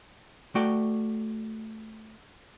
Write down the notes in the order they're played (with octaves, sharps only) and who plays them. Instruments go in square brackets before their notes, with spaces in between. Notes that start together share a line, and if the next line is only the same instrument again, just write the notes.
[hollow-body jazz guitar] A3 F#4 D5 G5